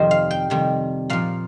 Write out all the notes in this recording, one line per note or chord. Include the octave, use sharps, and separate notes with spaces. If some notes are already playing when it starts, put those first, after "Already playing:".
Already playing: F2 C3 D#3 G3 C5 D#5
F5
G5
F2 C3 D#3 G3
A#2 F3 F5